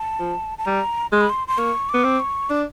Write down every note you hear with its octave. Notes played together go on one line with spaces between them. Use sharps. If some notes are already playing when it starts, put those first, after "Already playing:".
Already playing: A5
F3
A5
G3 A#5
G#3 C6
B5
C6
C6
A#3 C#6
D6
B3
C4
C#6
D4 D6